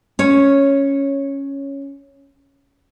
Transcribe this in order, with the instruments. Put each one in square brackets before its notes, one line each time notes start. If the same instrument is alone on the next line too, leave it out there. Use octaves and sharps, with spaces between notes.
[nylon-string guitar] C#4 C#5